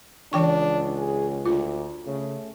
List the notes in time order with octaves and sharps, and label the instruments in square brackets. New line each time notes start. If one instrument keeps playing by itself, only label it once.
[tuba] C#2 [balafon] E3 G5 C#6 [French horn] D4
[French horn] G#4
[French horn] D2 [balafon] F4
[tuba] C#3 [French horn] A3